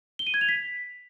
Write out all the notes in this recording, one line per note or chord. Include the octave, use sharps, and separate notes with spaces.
G7
D#7
G#6
F7
B6